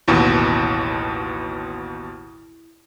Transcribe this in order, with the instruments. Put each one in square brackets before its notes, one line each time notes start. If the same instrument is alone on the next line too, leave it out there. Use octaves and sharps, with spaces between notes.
[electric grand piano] A1 D#2 B2 [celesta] E4